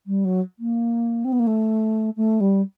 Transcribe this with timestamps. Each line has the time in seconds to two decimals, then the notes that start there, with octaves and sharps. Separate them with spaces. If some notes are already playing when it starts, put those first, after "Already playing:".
0.06 G3
0.24 F#3
0.59 A#3
1.25 C4
1.32 B3
1.39 A#3
1.47 A3
2.16 A3
2.40 G3